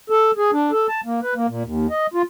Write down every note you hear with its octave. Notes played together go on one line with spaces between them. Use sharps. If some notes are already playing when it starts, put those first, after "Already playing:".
A4
G#4
D4
A4
A5
A#3
B4
A#3
A#2
D#2
D#5
F4